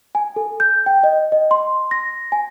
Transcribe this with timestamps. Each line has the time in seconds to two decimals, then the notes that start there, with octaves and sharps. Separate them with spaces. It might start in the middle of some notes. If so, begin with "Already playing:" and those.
0.15 G#5
0.36 A4
0.60 G6
0.86 G5
1.03 D#5
1.32 D#5
1.51 C6
1.91 A#6
2.32 G#5